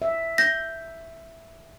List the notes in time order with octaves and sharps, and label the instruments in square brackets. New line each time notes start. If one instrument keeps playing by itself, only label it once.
[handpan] E5
[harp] G6 [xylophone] A#6